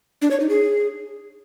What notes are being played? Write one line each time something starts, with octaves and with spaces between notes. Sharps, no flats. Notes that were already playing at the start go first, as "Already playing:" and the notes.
D4
C#5
D#4
G#4